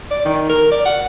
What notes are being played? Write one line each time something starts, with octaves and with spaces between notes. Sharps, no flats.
D5
D#3
A#4
D5
F#5